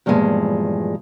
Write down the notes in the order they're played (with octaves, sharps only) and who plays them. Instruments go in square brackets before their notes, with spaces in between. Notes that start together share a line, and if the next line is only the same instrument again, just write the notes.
[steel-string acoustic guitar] E2 G2 A#2 F3 G#3